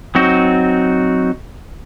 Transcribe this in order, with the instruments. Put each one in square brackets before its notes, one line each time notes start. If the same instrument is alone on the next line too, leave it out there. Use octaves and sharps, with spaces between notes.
[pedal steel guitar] F#3 C4 D#4 F#4